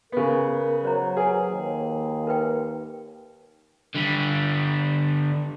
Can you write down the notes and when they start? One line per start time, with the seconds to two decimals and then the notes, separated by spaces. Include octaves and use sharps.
0.12 C#3 B3 A#4
0.85 F#3 C5 C#5 A#5
1.17 G#4 B4 G#5
1.48 D#2
2.27 A#4 B4 G5
3.95 D3 G3